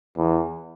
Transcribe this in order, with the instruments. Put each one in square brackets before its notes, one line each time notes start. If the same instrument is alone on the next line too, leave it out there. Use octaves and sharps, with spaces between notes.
[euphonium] E2